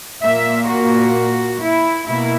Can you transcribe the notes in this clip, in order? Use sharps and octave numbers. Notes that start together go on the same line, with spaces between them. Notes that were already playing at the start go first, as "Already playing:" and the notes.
A#2 A#3 E5
F#4
E4
B2 A#3 E4